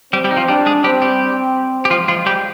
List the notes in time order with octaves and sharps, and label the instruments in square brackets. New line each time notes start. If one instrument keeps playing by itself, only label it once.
[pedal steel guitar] G3 G4 [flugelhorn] C4
[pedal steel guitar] G3 G4
D#4
F3 F4
[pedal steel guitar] G3 G4 [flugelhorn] D4
[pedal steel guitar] G#3 G#4
[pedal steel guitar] G3 G4 [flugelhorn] C4
[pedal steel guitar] G3 G4
G4
[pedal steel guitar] F3 F4 [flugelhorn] G#3
[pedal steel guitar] F3 F4
G3 G4